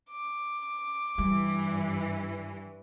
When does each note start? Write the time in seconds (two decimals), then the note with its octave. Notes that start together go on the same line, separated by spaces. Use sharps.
0.10 D6
1.18 G2 E3 G3